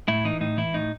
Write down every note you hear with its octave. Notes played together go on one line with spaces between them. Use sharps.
A2 E4
E3 D#4
A2 D#4
E3 E4
A2 D#4